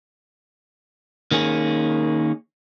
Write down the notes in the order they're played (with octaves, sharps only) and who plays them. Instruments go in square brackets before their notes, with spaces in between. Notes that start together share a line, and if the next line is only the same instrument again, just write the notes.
[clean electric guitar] D#3 A#3 C#4 G#4